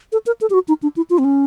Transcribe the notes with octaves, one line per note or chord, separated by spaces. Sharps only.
A4
A#4
A4
G4
F#4
D#4
D4
E4
F4
C4
C#4